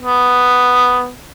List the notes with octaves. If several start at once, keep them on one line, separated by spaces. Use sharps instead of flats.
B3